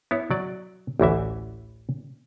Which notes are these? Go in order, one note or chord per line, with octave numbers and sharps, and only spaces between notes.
B3 E4 C#5
F#3 D5
A1 D2 E3 E5